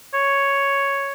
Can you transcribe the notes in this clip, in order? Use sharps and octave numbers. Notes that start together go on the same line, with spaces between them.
C#5